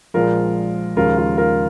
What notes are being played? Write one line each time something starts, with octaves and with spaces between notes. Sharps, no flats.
A#1 A#2 F3 G#3 F4 A#4
D#2 C#3 F3 G#3 F4 A#4
F4
F4 A#4